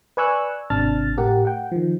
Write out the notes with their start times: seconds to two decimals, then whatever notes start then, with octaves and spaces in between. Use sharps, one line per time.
0.17 B4 D5 G#5 C#6 E6 F#6
0.70 G#1 C3 D4 A5 F6 A6
1.17 A2 G4 A#4 F#5
1.45 F#5 G5
1.72 D#3 F3